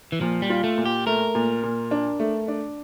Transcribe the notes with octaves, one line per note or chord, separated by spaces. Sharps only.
E3
A#2 F3
G3
F4
A3
A#2
G4
A3 A#4
A#2
A#2
D4
A3
D4